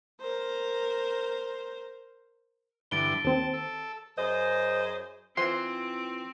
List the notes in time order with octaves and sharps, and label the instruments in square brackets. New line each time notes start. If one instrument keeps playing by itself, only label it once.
[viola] A#4 C5
[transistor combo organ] G2 D3 E3 [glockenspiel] A6 D7 G7
[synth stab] D#2 C4 [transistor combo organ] A5
[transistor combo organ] A4
[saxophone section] F#2 G#4 C5 D#5
[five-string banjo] E3 F4 C5 [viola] C4 [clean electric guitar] C6